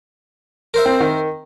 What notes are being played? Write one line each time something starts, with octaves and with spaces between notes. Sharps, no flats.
A#4 C5 E5
C4
D#3